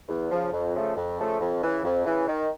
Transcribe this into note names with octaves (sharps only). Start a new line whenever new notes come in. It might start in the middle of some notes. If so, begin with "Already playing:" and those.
E2
C#3 F3
F2
C#3 F3 A3
F2
C#3 F3 A3
F2
C#3 E3
F2
C#3 E3
D#3